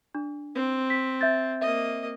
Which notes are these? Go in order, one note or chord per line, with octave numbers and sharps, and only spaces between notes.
D4
C4
B6
E5 G6 A6
A#3 D#5 E5